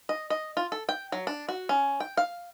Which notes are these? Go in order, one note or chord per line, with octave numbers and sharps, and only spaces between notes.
D#5
D#5
F4
A4
G5
F#3
D4
F#4
C#4
G5
F5